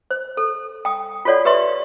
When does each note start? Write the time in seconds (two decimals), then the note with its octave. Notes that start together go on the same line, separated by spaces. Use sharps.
0.11 C5
0.37 A4
0.85 G5 D#6
1.25 F4 F#4 A4 C#5 D5 F#5
1.45 G4 B4 D5 E5 C6